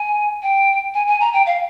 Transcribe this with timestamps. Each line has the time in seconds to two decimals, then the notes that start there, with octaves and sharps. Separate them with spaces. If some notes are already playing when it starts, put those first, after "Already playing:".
Already playing: G#5
0.43 G5
0.94 G#5
1.07 G#5
1.21 A#5
1.33 G5
1.46 F5